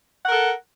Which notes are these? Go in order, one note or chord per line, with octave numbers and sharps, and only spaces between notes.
A4 A#4 F#5